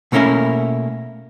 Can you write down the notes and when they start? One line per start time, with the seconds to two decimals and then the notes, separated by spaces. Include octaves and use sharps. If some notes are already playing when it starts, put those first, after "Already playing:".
0.12 B2 A3 A#3 C#4 E4 A#4